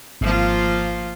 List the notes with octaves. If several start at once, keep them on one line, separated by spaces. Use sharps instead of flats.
G#1 F3 A#3 F4